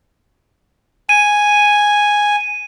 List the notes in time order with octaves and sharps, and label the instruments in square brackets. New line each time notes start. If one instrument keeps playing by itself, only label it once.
[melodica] G#5 [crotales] D#7